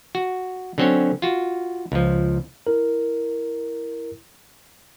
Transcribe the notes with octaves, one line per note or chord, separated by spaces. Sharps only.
F#4
D3 F#3 C4 C#4 C#5
F4 F#4
C#2 F3
E4 A#4